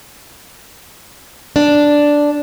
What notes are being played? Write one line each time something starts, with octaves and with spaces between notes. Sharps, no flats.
D4